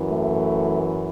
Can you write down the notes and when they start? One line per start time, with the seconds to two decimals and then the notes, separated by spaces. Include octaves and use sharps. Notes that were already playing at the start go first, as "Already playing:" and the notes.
Already playing: F#2 E3
0.08 A3